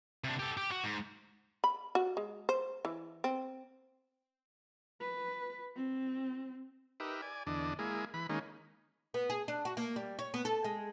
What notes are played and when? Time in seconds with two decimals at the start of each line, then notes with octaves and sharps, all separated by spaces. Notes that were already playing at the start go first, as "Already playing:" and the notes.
0.24 C3 D4
0.39 G4 A4
0.57 G4
0.71 F#4
0.84 G#2
1.64 B5
1.95 F#4
2.17 G#3
2.49 C5
2.85 E3
3.24 C4
5.01 B4
5.76 C4
7.00 D#4 G4 A#4 B4 E5
7.22 D5 G#5
7.47 E2 D3 D4 D#5
7.79 G#3 A#3 E4 G#4
8.14 E3 B4 B5
8.29 D#3 G#3 A#3 C#4 D#4
9.14 B3
9.30 G#4
9.48 D4
9.65 F#4
9.77 A#3
9.96 G3
10.19 C#5
10.34 B3
10.45 A4
10.64 G#3